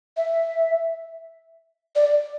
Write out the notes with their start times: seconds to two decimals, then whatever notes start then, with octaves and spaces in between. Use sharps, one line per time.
0.17 E5
1.96 D5